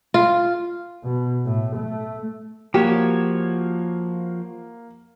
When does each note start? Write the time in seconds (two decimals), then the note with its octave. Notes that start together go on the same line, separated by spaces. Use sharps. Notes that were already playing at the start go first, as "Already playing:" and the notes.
0.14 F4
1.04 B2
1.45 A2
1.76 A3
2.74 F3 A#3 F#4 G4 C#5